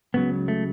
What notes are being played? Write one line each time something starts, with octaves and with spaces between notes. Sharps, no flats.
C#2 C#3 F#3 B3
A3